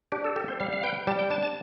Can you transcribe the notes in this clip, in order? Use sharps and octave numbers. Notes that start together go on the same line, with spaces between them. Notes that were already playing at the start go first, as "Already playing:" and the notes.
D4 G4
A4
G4 A4
C5
G3 F5
F5
B4 G5
G3 A5
G5
D4 A5
A5